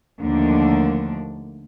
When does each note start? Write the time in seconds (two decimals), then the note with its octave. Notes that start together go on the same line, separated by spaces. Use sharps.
0.20 D#2 D3 F3 A3 A#3 D4